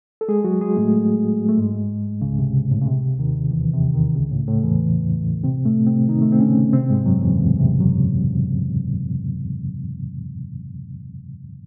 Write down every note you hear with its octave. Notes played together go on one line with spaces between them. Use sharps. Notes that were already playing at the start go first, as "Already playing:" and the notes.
A4
G#3 G#4
F#3 F#4
G#3 G#4
A2 A3
A3
G#2 G#3
C#2 C#3
C3
A2
C#3
C3
D#2 D#3
E2 E3
C3
D#2 D#3
C#2 C#3
A2
A2
E2 E3
C3 C4
A2 A3
C3 C4
D#3 D#4
A3
C4
C#3 C#4
C3 C4
G#2 G#3
F#2 F#3
E2 E3
C#2 C#3
A2
C3
F#2 F#3